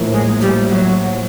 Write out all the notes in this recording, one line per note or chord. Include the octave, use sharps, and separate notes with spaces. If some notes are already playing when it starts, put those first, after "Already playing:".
Already playing: A#1 A2 F3 A#3
G#3
G3
F#3